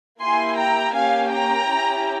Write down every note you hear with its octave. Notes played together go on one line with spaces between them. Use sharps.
A#3 E4 G4 G#5 C6
G5 A#5
A#3 C#4 G4 F5 G#5
G5 A#5
C#4 E4 G4